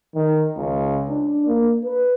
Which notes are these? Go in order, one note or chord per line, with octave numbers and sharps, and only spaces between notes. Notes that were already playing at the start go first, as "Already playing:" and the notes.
D#3
C#2
D4
A#3
B4